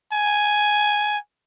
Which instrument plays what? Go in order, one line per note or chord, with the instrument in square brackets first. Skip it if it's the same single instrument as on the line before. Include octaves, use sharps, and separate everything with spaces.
[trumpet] G#5